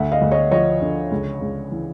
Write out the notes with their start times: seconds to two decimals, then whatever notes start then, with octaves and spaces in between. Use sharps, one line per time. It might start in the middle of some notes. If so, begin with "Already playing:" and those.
Already playing: D2 E5 F#5
0.12 D#5 F5
0.22 D2
0.31 C#5 D#5
0.51 F3 C#5 D#5
0.81 D3
1.11 C#2
1.41 C#2
1.71 E3